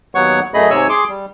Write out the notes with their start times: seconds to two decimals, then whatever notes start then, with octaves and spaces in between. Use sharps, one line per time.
0.15 D#2 F#3 B3 C#5 F#5 C#6
0.54 F#2 A3 G#4 D#5 B5
0.71 G#2 C3 C#5 G#5 C#6 E6
0.89 G#4 C6 D6
1.09 G3